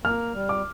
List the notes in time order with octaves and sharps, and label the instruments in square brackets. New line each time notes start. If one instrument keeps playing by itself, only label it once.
[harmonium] A#3 [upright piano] F6
[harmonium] G3
[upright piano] D6